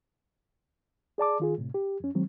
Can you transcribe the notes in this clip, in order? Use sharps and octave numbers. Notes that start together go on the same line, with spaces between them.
G#4 D5 A5 D6
D#3 F4 G#4
A2 C3
G4
F2 C#4
D#3 F#3 G#3 C4